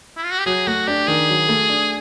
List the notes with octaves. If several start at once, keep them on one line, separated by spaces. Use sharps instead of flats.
E4
F4
F#4
G4
F#3 G#4
A3 F#4
D4 G4
D#3 G#4
F#3
A3
D4